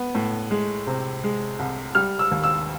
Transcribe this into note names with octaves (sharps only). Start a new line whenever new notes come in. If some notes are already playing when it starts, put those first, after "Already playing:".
Already playing: B3
A2
G#3
C3
G#3
C2
G3 F6
E6
D#2
E6